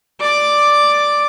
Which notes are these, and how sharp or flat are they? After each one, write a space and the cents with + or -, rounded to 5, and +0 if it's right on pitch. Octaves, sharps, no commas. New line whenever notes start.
D5 +0 D6 +5